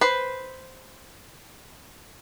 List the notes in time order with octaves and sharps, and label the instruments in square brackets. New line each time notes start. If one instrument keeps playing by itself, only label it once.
[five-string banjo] B4 C5